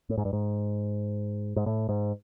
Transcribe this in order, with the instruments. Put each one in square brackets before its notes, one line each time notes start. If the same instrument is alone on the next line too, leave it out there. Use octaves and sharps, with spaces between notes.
[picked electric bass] A2
G#2
G2
G#2
G#2
A2
G#2